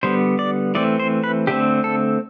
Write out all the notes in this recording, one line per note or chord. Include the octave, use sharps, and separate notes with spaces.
D3 G3 B3 C5
D5
E3 A3 C4 D5
C5
B4
D3 A3 C4 G4
A4